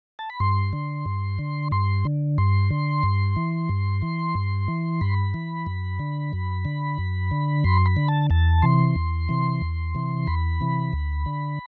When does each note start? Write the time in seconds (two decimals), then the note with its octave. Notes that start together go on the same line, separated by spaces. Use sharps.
0.19 A5
0.30 B5
0.40 G2 C6
0.73 D3
1.06 G2
1.39 D3
1.72 G2 C6
2.05 D3
2.38 G2 C6
2.71 D3
3.03 G2
3.36 E3
3.69 G2
4.02 E3
4.35 G2
4.68 E3
5.01 G2 B5
5.34 E3
5.66 F#2
5.99 D3
6.33 F#2
6.65 D3
6.98 F#2
7.31 D3
7.64 F#2 C6
7.86 B5
7.96 D3
8.08 A5
8.30 E2 A5
8.62 C3 E3 C6
8.96 E2
9.29 C3 E3
9.62 E2
9.95 C3 E3
10.27 E2 B5
10.61 C3 E3
10.93 D2
11.26 D3